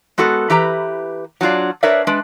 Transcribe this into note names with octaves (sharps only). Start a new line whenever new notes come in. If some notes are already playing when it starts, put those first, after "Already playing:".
G#3 B3 F#4 A4 A#4
E3 G4 B4 A#5
F#3 D4 F4 D5
D4 A#4 B4 C#5 D5 E5
G#3 D4 B4